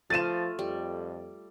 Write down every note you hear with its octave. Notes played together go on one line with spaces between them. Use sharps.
F3 A3 F4 A6 D#7 E7
F2 G3